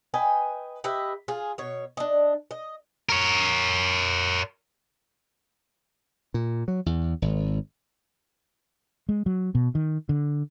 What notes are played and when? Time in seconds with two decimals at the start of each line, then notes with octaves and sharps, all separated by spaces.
0.14 B4 D#5 G5 G#5
0.84 G4 B4 D#5 E5
1.28 F4 G#4
1.58 B2 C#5
1.97 D4 D#5
2.51 D#5
3.09 A#4 C#5
6.34 A#2
6.68 F#3
6.86 E2
7.22 G#1
9.09 G#3
9.26 F#3
9.55 B2
9.75 D#3
10.09 D3